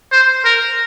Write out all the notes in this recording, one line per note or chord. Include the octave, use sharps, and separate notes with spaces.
C5
A#4